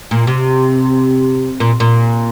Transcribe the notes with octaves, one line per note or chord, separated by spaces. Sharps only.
A#2
C3
A#2
A#2